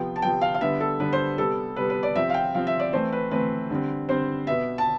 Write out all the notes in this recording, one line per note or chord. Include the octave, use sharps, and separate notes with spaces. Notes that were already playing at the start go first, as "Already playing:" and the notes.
Already playing: C3 F3 B3 G5
A5
C3 F3 B3 G5
F5
F5
D3 G3 B3 E5
A4
D3 G3 B3 B4
C5
C3 G3 B3 A4
C3 G3 B3 B4
B4
D5
C3 F3 C4 E5
F5
G5
C3 F3 C4 F5
E5
D5
E3 A3 C4 C5
B4
E3 A3 C4 B4
D3 G3 C4
D3 G3 C4 C5
B2 B3 E5
A5